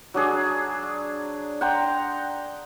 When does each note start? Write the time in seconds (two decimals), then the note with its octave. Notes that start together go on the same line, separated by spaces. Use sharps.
0.14 F#3 D4 G#4
1.61 F#5 G5 A#5 C6